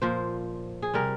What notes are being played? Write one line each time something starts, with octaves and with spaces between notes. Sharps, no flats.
A#2 F3 C5
G#4
C3 G3 A#4